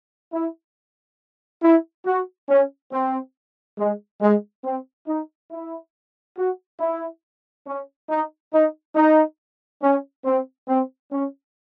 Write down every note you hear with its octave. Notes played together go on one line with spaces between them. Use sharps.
E4
E4
F#4
C#4
C4
G#3
G#3
C4
D#4
E4
F#4
E4
C#4
D#4
D#4
D#4
C#4
C4
C4
C#4